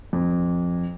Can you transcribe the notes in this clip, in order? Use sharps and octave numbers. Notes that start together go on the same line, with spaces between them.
F2